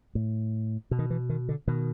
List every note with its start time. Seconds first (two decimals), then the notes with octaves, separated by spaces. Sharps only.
0.15 A2
0.91 B2
0.99 D#3
1.10 E3
1.30 D#3
1.49 D3
1.68 B2 D#3